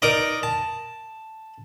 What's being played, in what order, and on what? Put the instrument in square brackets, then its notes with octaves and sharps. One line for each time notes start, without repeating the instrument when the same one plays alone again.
[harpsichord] D#4 A#4 D5 D#5
A5